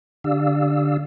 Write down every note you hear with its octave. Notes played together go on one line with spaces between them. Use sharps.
D3 D4 G4 D5 F5 E6